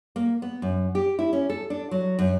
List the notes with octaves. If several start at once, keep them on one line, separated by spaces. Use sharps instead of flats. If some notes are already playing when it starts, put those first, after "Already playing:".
A#3
B3
F#2
G4
E4
C#4
A4
D4
F#3
F#2